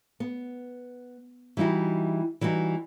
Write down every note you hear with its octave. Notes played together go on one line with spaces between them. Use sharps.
B3
E3 G3 D#4 E4 F#4
E3 G3 D#4 F#4